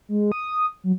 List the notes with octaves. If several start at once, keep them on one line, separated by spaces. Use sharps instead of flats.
G#3
D#6
F#3